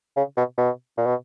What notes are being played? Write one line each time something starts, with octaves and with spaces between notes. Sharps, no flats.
C#3
B2
B2
A#2
B2